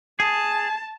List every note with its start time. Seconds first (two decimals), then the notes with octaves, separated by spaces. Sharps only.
0.20 G#4 A5